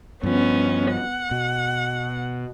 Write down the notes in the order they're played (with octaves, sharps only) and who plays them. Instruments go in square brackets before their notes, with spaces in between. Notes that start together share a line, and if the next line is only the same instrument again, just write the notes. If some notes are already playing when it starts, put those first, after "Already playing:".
[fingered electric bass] G2 F3 [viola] B3 C#4
[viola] F#5
[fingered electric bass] B2